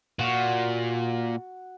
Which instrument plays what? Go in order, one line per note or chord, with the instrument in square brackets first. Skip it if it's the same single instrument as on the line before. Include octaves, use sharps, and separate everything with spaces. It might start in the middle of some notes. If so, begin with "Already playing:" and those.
[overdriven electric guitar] A#2 [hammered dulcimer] F#4